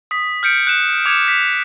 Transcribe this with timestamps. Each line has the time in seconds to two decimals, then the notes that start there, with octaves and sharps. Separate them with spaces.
0.11 D#6 B6
0.43 F6 G6 C#7 D7
0.67 F#6 E7
1.06 D6 G#6 C#7 D7 E7
1.28 B6